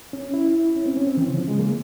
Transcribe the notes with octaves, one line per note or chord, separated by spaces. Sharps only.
C#4
E4
C#4
C4
C#4
C4
E3
C#3
F3
G#3
A#3